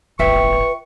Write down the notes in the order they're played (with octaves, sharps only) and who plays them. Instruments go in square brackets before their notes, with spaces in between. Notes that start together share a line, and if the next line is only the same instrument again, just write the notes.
[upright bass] D1 G1 [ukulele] F4 E5 G5 [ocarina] B4 [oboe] C#6